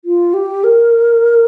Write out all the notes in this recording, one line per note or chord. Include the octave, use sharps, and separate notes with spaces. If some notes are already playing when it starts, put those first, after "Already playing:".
F4
G4
A#4